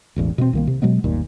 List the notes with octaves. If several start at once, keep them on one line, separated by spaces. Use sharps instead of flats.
E1 A1 E2
B2 A3 C4
C2 D#3 A#3
C3
B2 F#3 G#3 B3
G1 D#2 A#2